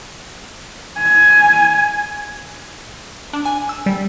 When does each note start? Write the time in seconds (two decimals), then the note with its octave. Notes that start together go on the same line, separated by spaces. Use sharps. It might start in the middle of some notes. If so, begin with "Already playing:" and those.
0.98 G#5
3.33 D4
3.45 G#5
3.69 E6
3.86 G3